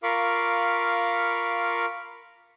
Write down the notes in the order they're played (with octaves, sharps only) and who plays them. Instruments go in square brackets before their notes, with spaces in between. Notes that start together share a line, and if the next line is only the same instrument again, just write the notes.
[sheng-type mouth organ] F4 A#4 F5 B5 C#6 D6